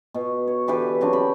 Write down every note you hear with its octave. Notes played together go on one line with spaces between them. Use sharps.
B2
C#5
D3 E3 G4 B4
C#3 F#3 C4 D4
G4 B5